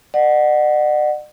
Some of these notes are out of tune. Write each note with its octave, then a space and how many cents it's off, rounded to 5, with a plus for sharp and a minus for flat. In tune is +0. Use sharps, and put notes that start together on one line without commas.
D5 +45 F#5 +0